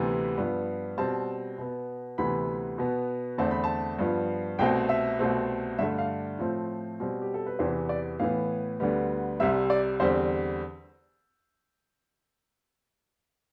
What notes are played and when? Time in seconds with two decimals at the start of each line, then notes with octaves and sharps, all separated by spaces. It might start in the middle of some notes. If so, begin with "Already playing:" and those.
Already playing: D2 C3 E3 B3
0.38 G2 F3 B3
0.98 B2 G3 C4 A5
1.58 B2 B3
2.18 D2 C3 E3 B3 B5
2.78 B2 B3
3.38 E2 D3 A3 C4 A5
3.51 B5
3.64 A5
3.99 G2 F3 B3
4.59 C2 B2 A3 C4 G5
4.89 E5
5.19 C2 B2 A3 C4
5.78 G2 D3 A3 E5
5.98 F5
6.39 A2 F3 A3 C4
7.00 B2 G3 C4
7.22 G4
7.34 A4
7.46 B4
7.59 E2 C3 E3 B3 C5
7.89 D5
8.19 A2 E3 B3 F5
8.80 D2 D3 G3 B3
9.40 C2 C3 G3 E5
9.70 D5
10.00 E2 D3 G3 C4 C5